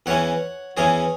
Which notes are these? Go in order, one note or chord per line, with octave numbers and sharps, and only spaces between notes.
E2 E3 C#4 C#5 F#5
E2 E3 C#4 G#4 C#5